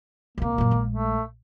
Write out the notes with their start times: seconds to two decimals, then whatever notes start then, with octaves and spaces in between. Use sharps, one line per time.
0.38 C#2 C3 A#3
0.58 F#2 A#2
0.71 A#1 G#3
0.90 A3